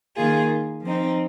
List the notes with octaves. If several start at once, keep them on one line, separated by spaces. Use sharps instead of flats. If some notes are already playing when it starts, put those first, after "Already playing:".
D#3 A#3 F4 G#4
F3 C4 D#4